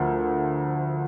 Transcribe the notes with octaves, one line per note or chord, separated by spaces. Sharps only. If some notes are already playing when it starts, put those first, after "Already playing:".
Already playing: D2 D3 F3 A#4